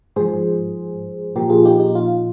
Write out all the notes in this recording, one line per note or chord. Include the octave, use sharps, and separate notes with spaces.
G#2 F3 G#4 C5
A#2 F3 G4 A#4
F4 G#4
D#4 G4
D#4
F4